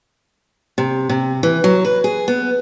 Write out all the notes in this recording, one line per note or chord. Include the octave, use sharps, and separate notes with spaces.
C3
C3
E3
F#3
B4
G#4
B3